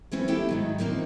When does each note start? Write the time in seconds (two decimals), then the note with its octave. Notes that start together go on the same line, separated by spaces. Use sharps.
0.12 E3 F3 C4 C#4 E4
0.28 A3 B3 E4 G4 A4 G5
0.49 G#2 D#3 F#3
0.78 A2 E3 F3 A#3 C4 D#4